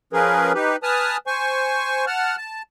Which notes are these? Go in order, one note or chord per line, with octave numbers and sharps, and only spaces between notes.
F3 C#4 G#4 A#4 B4
D#4 G4 B4
B4 G#5 A5 D#6 F6
C5 G#5 C#6
F#5 A5 F6
A5